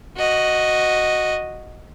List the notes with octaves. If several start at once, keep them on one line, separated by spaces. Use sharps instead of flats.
F#4 D#5